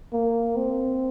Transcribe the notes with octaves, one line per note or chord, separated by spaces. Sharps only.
A#3
C4